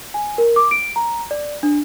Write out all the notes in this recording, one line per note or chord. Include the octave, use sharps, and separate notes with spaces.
G#5
A#4
D6
D7
A#5
D5
D4